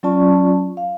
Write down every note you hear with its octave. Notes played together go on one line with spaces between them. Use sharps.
F#3 C#4 F4 D5 A5 C#6
F5